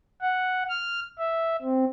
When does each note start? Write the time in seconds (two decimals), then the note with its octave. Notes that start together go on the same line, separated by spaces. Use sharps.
0.22 F#5
0.69 F6
1.18 E5
1.62 C4